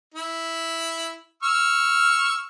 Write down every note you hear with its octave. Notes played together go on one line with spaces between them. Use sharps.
E4
C#6 E6 F6